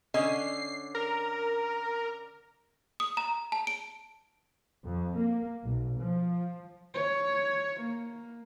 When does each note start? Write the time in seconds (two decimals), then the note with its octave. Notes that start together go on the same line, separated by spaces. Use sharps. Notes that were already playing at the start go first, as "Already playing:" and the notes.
0.14 D3 C#4 D#5 C7
0.95 A#4
3.00 D#6
3.17 A#5
3.52 A5
3.67 D7
4.86 F2
5.17 A#3
5.64 B1
5.99 F3
6.94 C#5
7.80 A#3